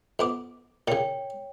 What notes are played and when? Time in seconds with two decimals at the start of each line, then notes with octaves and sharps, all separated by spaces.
0.19 F2 B3 D6
0.88 A#2 C#3 C#5 G5